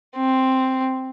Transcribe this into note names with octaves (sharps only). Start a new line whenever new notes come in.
C4